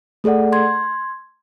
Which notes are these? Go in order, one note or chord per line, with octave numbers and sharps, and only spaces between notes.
A3 G#4 A4 D5 F#5
C6 G#6